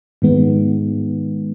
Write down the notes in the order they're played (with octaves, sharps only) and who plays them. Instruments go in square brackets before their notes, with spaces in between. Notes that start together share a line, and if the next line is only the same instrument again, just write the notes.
[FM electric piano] G#2 D#3 G#3 B3